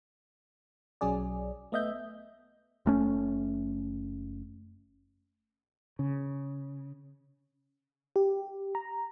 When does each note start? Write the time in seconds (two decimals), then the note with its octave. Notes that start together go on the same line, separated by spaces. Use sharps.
1.01 B1 F#3 C#4 G#4 D5
1.72 A3 B3 D#5 E5 G6
2.86 F#1 A3 C#4
5.99 C#3
8.16 G4
8.75 A#5